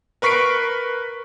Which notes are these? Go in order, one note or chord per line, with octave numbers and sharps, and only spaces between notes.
A#4 B4 C#6 B6 C7 D7